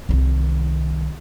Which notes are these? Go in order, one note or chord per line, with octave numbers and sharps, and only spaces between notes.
C2 D#3